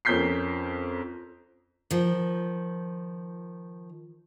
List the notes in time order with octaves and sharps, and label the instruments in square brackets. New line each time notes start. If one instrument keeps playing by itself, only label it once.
[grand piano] F2 C#4 A#4 G6 B6 C7
[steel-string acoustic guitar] D#3 F3